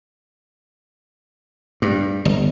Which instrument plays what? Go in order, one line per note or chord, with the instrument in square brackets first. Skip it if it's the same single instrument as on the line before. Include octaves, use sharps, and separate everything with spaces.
[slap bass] G2
G1